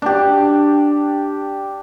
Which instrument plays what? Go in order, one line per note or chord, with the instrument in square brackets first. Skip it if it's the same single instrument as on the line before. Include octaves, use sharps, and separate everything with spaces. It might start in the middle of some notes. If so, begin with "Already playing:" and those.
[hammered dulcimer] D4 G4